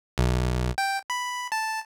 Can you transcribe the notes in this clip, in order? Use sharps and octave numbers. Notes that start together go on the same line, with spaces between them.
B1
G5
B5
A5